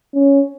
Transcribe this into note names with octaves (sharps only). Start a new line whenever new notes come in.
C#4